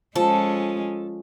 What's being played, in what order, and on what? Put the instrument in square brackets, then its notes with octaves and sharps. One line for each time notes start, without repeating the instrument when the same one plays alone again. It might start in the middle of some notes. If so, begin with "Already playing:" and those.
[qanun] F3 [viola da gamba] G#3 C#4 [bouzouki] A4